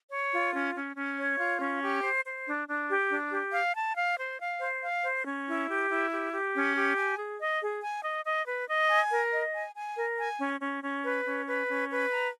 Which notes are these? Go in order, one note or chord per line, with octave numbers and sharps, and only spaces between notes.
C#5
F4
C#4
C#4
C#4
C#5
F4
C#4
G4
C5
C5
D4
D4
G4
D4
G4
F5
A5
F5
C5
F5
C5
F5
C5
C#4
E4
G4
E4
G4
G4
C#4
G4
G#5
G#4
D#5
G#4
G#5
D#5
D#5
B4
D#5
G#5
A#4
D#5
G#5
G#5
A#4
G#5
C#4
C#4
C#4
B4
C#4
B4
C#4
B4
A#5